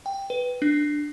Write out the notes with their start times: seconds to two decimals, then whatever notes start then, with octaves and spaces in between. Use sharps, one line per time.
0.06 G5
0.30 B4
0.62 D4